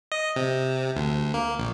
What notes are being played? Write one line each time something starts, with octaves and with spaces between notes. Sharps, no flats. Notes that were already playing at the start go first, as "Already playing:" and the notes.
D#5
C3
D2
A#3
A#1